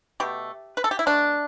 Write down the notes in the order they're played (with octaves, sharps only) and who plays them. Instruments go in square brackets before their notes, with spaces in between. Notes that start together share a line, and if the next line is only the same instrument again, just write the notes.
[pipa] B2 A3 G4
B4
A4
G4
E4
B2 A3 D4